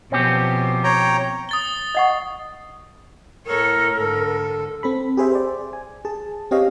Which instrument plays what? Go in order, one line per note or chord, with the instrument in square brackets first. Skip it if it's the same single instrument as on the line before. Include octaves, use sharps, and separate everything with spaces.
[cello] B2 F3 [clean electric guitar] C4 C#4 G4
[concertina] C#5 G5 A#5
[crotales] D#6 A6 G7
[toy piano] D#5 F#5 C#6
[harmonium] A2 [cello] A4 C#5 [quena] A#4
[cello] G#2 D3 [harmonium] A4
[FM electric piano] C4 A4 B5
G4 G#4 C5 E5
C5 D5
G#5
G#4 A5
C4 G4 C#5 D#5 F5